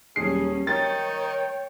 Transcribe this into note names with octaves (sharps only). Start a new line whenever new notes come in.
D#1 F#3 G3 C#4 G#4 C7
D#3 C#5 G5 A6